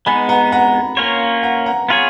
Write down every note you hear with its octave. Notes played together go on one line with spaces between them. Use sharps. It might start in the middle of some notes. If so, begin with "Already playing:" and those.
G#3 B3 D#4 G#5 B5
F#5 A#5
F#5 A#5
A#3 C#4 F4 A#4 C#5
F#5 A#5
F#5 A#5
B3 F4 G#4 C#5